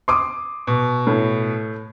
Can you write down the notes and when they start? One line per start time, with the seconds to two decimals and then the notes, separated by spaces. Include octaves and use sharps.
0.08 C6 D6 D#6
0.67 B2
1.07 A2